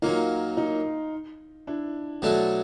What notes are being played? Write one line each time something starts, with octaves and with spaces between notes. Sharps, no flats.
A#2 F#3 A#3 D#4 F4
D#4
D4 E4
B2 F#3 A3 D4